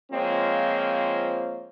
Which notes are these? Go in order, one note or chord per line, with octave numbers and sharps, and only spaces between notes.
F3 G#3 A#3 C4 F4 C#5